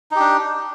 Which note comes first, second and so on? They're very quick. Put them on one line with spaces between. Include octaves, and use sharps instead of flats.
D#4 G4 D4